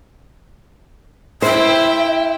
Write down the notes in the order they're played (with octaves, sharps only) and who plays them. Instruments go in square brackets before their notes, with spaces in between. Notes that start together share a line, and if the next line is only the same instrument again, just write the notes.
[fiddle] E4 G5 [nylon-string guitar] C5 [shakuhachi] E5